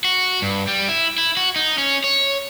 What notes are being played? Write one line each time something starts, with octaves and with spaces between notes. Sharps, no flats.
F#4
G2
G3
E4
E4
F#4
D#4
C#4
C#5